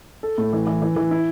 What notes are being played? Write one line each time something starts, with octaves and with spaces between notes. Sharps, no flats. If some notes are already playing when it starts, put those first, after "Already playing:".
A4
A2
E3
E3
E3
E3
E4